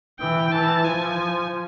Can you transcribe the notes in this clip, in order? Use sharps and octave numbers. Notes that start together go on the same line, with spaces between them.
E3 G5
E3 A5
F3 G#5